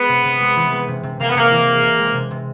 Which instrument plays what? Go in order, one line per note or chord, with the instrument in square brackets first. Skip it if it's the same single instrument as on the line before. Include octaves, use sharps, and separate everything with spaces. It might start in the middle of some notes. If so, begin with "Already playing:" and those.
Already playing: [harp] G#3 [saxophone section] B3
[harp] C3
C3
G#3
E3
G#3
C3
C3
[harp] C3 [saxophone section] A#3
[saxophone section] B3
[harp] C3 [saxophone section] A#3
[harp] E3
G#3
C3
G#3
C3
C3